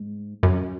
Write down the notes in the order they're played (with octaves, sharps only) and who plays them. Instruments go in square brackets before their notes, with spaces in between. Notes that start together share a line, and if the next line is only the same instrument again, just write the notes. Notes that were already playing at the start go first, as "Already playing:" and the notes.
Already playing: [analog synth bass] G#2
F#2